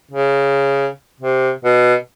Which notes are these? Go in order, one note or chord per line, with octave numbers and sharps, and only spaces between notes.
C#3
C3
B2